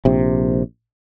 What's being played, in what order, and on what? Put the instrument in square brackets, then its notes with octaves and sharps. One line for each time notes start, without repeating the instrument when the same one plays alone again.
[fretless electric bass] A#1 C3